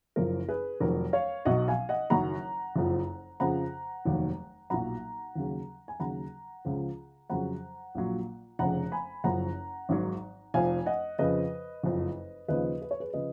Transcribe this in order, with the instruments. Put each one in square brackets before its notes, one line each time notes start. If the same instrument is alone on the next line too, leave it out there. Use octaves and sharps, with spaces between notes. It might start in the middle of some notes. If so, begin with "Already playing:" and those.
[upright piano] F#1 F#2 F3 A#4
G#4 B4
F1 F2 D#3 F#3 A#4
C#5 F5
B1 B2 F#3 D#5 F#5
F5 G#5
D#5 F#5
F#1 F#2 D#3 F#3 F#5 A#5
F#1 F2 F3
F2 C#3 F3 F#5 A#5
F1 D#2 D#3 F#3
B1 A#2 F#3 F#5 A#5
D#2 C#3 F#3
G#5
D#2 C#3 F#3 F#5 A#5
C#2 C#3 F3
F2 C#3 F#3 F#5 A#5
A#1 A#2 F#3
F1 F2 C#3 F#5 A#5
G#5 B5
F#1 F#2 F3 F#5 A#5
G#1 G#2 D#3 F#3
F1 F2 F3 F5 G#5
D#5 F#5
F2 C#3 F3 B4 D#5
F#1 F2 F3
D#2 C#3 F3 B4 D#5
B4
C#5
G#4 B4
C#3 F3 B4 D#5